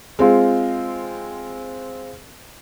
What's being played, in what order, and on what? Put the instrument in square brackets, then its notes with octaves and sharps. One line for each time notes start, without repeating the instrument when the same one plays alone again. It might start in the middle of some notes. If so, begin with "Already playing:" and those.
[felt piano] G#3 C4 F4